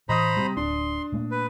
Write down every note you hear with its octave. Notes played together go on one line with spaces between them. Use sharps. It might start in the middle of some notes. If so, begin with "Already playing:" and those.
A2 E3 C5 D#5 A#5 B5 D#6
C3 G3 C4
D1 D4 C6
A#2 A3 A#3
B4